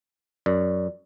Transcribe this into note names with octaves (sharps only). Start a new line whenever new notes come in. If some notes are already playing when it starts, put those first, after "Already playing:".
F#2 D5